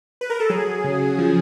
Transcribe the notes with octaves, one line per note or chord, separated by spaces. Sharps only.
B4
A#4
A4
F#3 G#4
C#3
F3